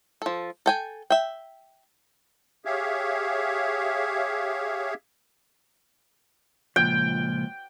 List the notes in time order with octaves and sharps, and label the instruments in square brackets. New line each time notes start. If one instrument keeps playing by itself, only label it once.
[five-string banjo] F3 A4
A4 G5 G#5
E5 G5
[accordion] G4 G#4 C#5 E5 F5
[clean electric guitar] C#2 A#2 F3 [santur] G5